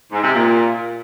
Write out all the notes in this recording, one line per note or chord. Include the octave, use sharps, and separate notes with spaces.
G#2
C3
A#2